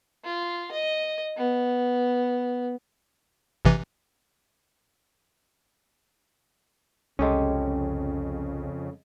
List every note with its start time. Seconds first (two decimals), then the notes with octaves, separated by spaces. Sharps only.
0.24 F4
0.72 D#5
1.37 B3
3.65 A1 C3 E3
7.19 C2 F2 C#3 G#3 C#4 G4 A4 D#5